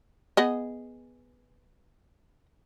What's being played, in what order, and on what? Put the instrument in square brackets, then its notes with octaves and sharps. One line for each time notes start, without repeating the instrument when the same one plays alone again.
[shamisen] B3 G#4 D#5